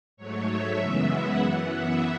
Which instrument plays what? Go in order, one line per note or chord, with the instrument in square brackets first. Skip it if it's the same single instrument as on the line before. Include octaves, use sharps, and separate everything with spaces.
[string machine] G#2 F#3 A3 C#5
E5
F#2 C#3 E3 G#3 B3
F#5
F#2 E3 B3
E5